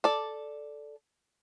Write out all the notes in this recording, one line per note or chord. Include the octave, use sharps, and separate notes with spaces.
A4 D5